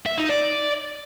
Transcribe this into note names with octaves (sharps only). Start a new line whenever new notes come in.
E5
D#4
D5